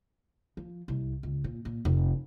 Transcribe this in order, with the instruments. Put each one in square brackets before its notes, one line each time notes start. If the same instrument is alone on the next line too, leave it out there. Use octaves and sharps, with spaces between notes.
[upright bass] F3
C2
C#2
A#2
A#2
F1